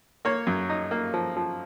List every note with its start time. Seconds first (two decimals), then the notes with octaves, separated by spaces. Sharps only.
0.25 A#3 C#5
0.47 F#2
0.70 D#4
0.91 A#3
1.14 F3
1.37 F3